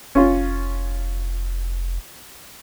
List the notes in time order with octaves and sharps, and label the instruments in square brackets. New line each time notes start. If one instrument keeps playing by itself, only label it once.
[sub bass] F1 [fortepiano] C#4 F4